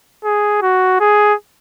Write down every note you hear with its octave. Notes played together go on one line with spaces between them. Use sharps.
G#4
F#4
G#4